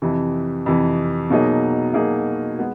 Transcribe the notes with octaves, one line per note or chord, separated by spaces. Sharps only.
F2 C3 E3
F2 C3 E3
B2 F#3 A#3 D#4 G#4
B2 F#3 A#3 D#4 G#4
G#3 B3